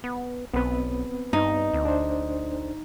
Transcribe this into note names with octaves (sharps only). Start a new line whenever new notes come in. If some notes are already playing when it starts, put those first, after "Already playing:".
B3
B1 B3 C4 B4
G2 D#4
D2
D4 C5